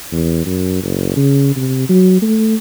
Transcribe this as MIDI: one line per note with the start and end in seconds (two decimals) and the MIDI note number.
0.12 0.45 40
0.46 0.78 42
0.83 1.15 30
1.16 1.54 49
1.56 1.87 48
1.89 2.20 54
2.22 2.55 57